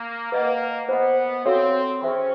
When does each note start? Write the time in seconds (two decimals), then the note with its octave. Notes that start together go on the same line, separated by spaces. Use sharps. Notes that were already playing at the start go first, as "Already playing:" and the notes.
Already playing: A#3
0.32 A#3 B4 D#5 F#5
0.89 B3 C5 D#5 F#5
1.45 C4 F#4 A4 C#5 F5
2.01 C#4 G#4 C5 E5 G5 C6